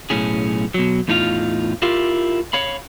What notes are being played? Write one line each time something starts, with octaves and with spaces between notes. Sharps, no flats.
B1 A2 C#4 G#4
B2 F#3
E2 A2 D#4 F4 F5
E4 F4 G4 A#4 F5
C#5 F5 B5